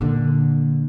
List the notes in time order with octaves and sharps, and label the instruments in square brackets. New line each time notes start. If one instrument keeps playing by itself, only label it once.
[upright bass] A#2 D3